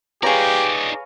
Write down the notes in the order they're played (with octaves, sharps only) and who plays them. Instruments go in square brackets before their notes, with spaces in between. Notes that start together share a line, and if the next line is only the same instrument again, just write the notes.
[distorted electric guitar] D#4 D5 [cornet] G4 [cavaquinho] G#4 A#5 [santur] B4 C#5 F5